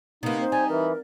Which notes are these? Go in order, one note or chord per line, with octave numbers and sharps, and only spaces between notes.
C3 A#3 B3 D#4
C5
G3 G#5
E3 A#4